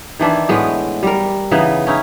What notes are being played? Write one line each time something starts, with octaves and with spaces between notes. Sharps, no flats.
D#3 E3 D4 E4
A2 G#3 B3
G3 A#4
C#3 E3 B3 D#4
C#4 D#4 E4